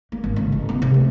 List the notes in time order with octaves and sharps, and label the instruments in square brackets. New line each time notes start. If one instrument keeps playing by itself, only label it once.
[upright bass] A#3
G#1
C#2
A1
B3
C3
D2